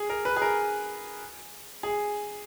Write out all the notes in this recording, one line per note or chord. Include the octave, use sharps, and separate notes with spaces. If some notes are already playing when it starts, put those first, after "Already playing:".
Already playing: G#4
A#4
B4
G#4
A#4
G#4